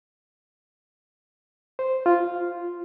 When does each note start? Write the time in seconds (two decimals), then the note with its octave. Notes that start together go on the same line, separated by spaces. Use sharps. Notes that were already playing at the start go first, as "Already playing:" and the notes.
1.79 C5
2.06 F4